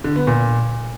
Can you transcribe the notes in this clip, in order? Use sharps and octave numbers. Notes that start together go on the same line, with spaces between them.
D3
B3
A#2